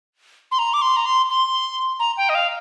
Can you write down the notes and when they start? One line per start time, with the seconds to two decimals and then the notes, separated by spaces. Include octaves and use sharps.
0.52 C6
0.59 A#5
0.73 D6
0.82 C6
0.96 A#5
1.06 C6
1.29 C6
2.00 A#5
2.17 G5
2.29 D#5
2.35 F5